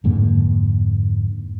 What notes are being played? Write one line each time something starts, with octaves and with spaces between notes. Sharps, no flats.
F2 G#2 D3 A#3